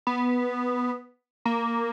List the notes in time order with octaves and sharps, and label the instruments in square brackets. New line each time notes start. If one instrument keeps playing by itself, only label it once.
[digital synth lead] B3
A#3